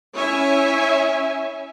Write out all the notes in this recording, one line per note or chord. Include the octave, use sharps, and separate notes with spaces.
C#4 E4 C#5 E5 G#5